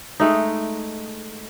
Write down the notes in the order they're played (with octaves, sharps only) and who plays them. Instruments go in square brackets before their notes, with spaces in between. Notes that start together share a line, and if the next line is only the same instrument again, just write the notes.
[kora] G#3 A3 D#4